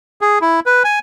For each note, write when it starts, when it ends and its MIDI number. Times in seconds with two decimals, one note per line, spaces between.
0.21 0.39 68
0.41 0.60 64
0.66 0.83 71
0.84 0.99 80